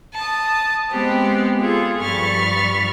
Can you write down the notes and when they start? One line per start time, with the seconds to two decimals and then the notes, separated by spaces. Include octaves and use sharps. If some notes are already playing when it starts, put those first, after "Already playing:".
0.14 A5 D#6
0.91 G#3 B3 C4 G4
1.60 F4 G#4 A4
2.02 G2 F3 B5 C#6 F6 A6